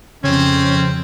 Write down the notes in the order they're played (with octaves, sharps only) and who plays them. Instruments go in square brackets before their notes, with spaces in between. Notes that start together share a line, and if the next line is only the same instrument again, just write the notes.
[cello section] F2 [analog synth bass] C#3 [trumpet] C4 [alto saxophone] C#4